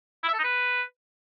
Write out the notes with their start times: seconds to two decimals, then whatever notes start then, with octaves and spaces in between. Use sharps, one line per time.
0.23 E4
0.29 E5
0.34 A4
0.39 D#4
0.44 B4